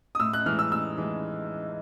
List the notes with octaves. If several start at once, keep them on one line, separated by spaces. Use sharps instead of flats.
D#6
A2 E6
F#6
E3 G#3 F6
E6
A2 E6
E3 G#3